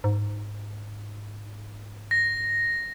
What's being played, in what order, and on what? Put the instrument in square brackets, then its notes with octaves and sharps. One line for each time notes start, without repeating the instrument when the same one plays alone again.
[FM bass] G#2
[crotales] A#6